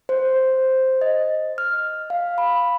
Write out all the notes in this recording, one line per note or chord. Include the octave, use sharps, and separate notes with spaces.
C5
D#5
F6
F5
B5